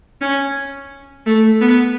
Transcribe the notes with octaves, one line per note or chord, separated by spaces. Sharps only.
C#4
A3
B3